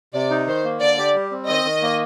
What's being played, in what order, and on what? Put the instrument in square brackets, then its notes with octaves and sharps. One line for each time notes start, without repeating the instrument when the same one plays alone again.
[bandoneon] C3 [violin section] D5
[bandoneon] D#4
[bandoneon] D#3 [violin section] C5
[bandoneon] A#3
[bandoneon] D3 [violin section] D5
[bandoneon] G4
G3
C4
[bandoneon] D#3 [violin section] D#5
[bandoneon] D#3
A#3